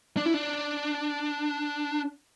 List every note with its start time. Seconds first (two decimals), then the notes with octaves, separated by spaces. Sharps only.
0.17 D4
0.26 E4
0.34 D4